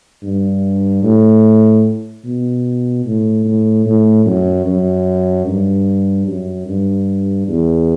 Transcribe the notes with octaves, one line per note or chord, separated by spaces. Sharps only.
G2
A2
B2
A2
A2
A2
F#2
F#2
G2
F#2
G2
E2